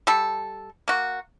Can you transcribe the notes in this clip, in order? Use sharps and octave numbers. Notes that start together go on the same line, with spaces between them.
G3 A4
A#3 F#4